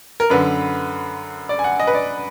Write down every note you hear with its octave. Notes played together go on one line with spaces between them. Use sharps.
A#4
F#2 D3 B4
D5
G#5
F#5
D#5
B4
D5